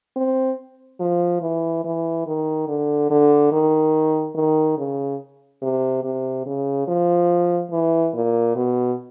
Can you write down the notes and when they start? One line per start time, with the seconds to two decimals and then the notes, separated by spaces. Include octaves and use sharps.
0.16 C4
1.00 F3
1.42 E3
1.85 E3
2.27 D#3
2.68 D3
3.10 D3
3.52 D#3
4.35 D#3
4.78 C#3
5.62 C3
6.04 C3
6.46 C#3
6.88 F3
7.71 E3
8.14 A#2
8.56 B2